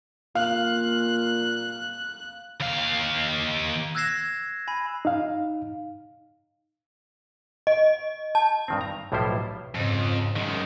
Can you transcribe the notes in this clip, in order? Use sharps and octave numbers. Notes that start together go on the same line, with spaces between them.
A#2 F5 F#6
D#2 F5
E6 F#6 G#6 A#6 C7 E7
G#5 B5
D#4 F5
D#5
A5
G2 D#3 C4
A#5
B1 A2 F3 G3 E4 C5
F2 G#2 C#3
F#2 D#3 G#3